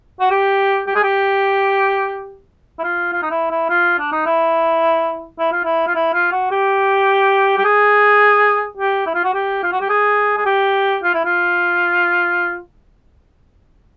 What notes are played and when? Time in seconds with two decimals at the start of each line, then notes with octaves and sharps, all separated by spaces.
0.20 F#4
0.31 G4
0.87 G4
0.95 G#4
1.03 G4
2.79 E4
2.84 F4
3.13 F4
3.23 D#4
3.31 E4
3.51 E4
3.69 F4
3.99 D4
4.12 D#4
4.26 E4
5.39 E4
5.52 F4
5.64 E4
5.87 F4
5.95 E4
6.14 F4
6.32 F#4
6.51 G4
7.58 G4
7.65 G#4
8.77 G4
9.06 E4
9.15 F4
9.24 F#4
9.34 G4
9.63 F4
9.72 F#4
9.81 G4
9.89 G#4
10.37 G#4
10.46 G4
11.03 F4
11.14 E4
11.25 F4